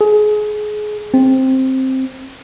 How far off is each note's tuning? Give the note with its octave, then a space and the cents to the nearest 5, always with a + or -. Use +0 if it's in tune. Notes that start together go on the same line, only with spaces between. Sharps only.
G#4 +25
C4 +5